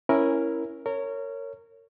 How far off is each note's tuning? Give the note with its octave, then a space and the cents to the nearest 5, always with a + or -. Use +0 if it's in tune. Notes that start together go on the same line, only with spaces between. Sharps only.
C#4 -5 E4 +0 A#4 +5
A#4 -25 C#5 +0